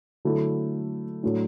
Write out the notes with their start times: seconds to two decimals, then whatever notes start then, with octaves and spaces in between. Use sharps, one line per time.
0.25 D3 F#3 A3 E4
1.23 A2 F#3 A3 D4